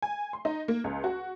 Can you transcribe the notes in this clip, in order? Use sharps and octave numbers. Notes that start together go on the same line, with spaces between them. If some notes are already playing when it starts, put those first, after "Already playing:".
G#5
C6
D#4
A#3
C#2
F#4